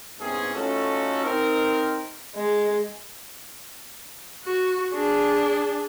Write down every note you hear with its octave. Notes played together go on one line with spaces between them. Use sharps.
C2 G#2 C3 B3 C#4 G#4
A3 C#4 D#4 F4 F#4 A4
C4 D#4 A#4
G#3
F#4
D4 G#4